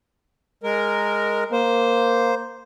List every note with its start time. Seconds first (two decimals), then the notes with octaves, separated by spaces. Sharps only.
0.63 G#3 A#4
1.52 A#3 C5